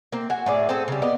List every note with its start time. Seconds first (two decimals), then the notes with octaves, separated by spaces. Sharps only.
0.12 A#3 C4
0.30 F#4 G#5
0.46 A2 G#4 D5
0.69 C4 G#4 A4 C5
0.88 C#3 G3
1.02 B3 D5 D#5